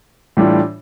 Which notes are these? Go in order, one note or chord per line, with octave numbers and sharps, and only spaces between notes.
A2 E3 G3 D4 F4